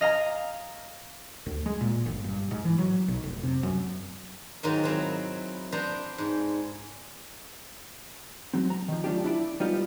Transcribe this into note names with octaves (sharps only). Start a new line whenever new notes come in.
D#5 F5 G#5 A#5
D2
G#3
A#2
G1
G2
G#2
E3
F#3
B1
F1
C3
F#2
G#2 D#3 F#3 D#4 F4
F#3 C4 D#4 E4
B3 D4 C5 D5 G5 A#5
G#2
F#3 C4
A#5
D#3 F3
F#3 A3 D4 F4 G4
D4 E4 D5
G3 B3 D#4 F4 G4